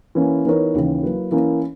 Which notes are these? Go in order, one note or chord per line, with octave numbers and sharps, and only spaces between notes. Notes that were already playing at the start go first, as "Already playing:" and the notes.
E3 A#3 C#4 E4
E3 B3 D#4 A#4 C#5
D#2 C#3 E3
F#3 A#3 E4 B4
E3 A#3 C#4 E4